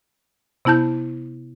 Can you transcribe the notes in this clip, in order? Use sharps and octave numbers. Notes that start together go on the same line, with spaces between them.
C3 B3 E4 A5 G6